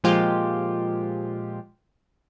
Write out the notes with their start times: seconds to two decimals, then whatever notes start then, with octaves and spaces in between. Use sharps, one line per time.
0.04 A#2 F3 G#3 F4 G4